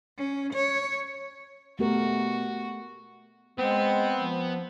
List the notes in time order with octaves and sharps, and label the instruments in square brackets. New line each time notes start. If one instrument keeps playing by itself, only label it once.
[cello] C#4
C#5
[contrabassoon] B2 [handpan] A3 G4 A#4 [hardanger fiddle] F#4
[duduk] G#3 [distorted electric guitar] B3 [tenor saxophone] C4
[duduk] F3